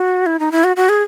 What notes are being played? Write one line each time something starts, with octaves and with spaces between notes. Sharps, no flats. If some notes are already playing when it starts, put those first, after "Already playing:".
Already playing: F#4
E4
D#4
E4
F#4
F#4
G#4